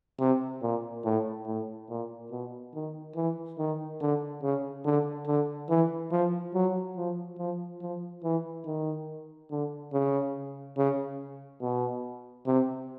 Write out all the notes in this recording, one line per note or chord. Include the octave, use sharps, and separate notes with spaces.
C3
A#2
A2
A2
A#2
B2
D#3
E3
D#3
D3
C#3
D3
D3
E3
F3
F#3
F3
F3
F3
E3
D#3
D3
C#3
C#3
B2
C3